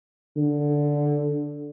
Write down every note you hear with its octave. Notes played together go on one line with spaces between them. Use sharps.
D3